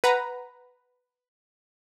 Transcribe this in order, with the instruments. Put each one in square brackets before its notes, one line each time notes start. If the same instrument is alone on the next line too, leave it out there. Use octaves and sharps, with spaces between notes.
[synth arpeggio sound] B4 F#5 A#5